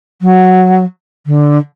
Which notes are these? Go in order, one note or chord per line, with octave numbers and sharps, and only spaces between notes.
F#3
D3